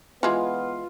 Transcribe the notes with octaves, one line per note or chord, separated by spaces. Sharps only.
E3 G#3 B3 F4